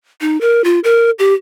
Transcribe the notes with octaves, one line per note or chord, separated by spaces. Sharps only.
D#4
A#4
F4
A#4
G4